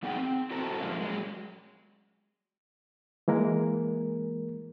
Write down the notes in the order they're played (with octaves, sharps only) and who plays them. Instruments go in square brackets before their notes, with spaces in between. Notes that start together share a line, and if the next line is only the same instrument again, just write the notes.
[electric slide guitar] F2 B3 D#4 G#4 F#5 G5
C4
E4 F#4 A4 C5 A#5
A#2 F3 G#3 A#3 C#4 E4
F#3 G#3
[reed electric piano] E3 G#3 A#3 A#4